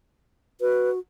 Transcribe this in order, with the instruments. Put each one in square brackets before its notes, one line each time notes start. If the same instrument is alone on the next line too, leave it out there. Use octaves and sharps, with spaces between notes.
[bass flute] F#4 [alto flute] B4